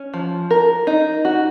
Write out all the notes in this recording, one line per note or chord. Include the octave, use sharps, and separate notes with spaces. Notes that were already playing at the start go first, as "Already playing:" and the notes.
Already playing: C#4
F3
A#4
D#4
F#4